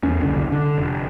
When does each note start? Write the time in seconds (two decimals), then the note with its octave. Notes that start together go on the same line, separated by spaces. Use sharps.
0.03 E2 C#4
0.21 F#1 C2 D3
0.52 D3
0.78 F1